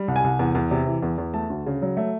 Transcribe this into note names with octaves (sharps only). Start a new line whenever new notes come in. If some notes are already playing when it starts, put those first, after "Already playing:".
Already playing: G3
C2
G#5
C2
E2
E2
C3
E3
E2
E2
A3 A5
D2
C#3
F#3
A3